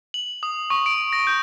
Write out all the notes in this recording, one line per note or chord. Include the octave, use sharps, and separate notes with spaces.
F#7
D#6
C#6
D7
A#6
G6